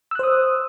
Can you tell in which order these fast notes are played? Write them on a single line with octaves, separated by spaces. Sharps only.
E6 F#6 C5 D#6